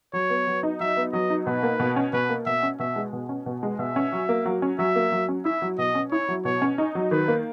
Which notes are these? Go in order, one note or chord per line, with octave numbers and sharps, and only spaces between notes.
F#3 C#5
B3
F#3
D#4
F#3 E5
B3
F#3 D#5
D#4
B2 B4
A#3
B2
C#4
B2 B4
A#3
B2 E5
C#4
B2 E5
G#3
B2
C#4
B2
G#3
B2 E5
C#4
F#3
A#3
F#3
C#4
F#3 E5
A#3
F#3
C#4
E4 E5
F#3
B2 D#5
C#4
E4 C#5
F#3
B2 C#5
C#4
D#4
F#3
D#3 B4
A#3